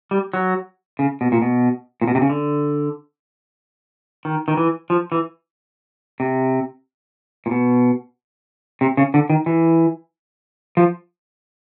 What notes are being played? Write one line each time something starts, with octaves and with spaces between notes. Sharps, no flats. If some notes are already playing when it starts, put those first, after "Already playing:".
G3
F#3
C#3
B2
A#2
B2
A#2
B2
C3
C#3
D3
D#3
D#3
E3
F3
E3
C3
A#2
B2
C3
C#3
D3
D#3
E3
F3